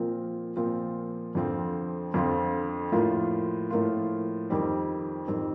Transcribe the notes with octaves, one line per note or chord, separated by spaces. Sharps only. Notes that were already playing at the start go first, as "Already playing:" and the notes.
Already playing: A#2 F3 C4 F4 A#4
A#2 F3 C4 F4 A#4
F2 D3 F3 C4 F4
F2 D3 F3 C4 F4
A2 F3 A#3 F4
A2 F3 A#3 F4
F2 D#3 G3 C4
F2 D#3 G3 C4